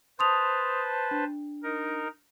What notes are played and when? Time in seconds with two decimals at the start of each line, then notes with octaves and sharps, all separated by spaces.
0.19 B4 C5 A5 C6 D#6 F7
1.11 D4
1.63 D#4 A#4